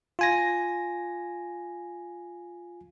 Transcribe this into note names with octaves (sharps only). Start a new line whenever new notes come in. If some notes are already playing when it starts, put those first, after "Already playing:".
F4 G#5 A#6